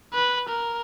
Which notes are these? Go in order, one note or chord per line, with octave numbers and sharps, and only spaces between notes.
B4
A#4